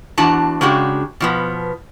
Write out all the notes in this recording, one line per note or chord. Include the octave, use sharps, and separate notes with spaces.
E2 D4 F#4 A5 A#5
C#3 G#3 D4 F#4 G4
B2 F3 B3